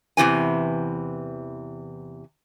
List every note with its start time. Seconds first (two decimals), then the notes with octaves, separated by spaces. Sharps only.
0.17 E2 C3 E3 G#5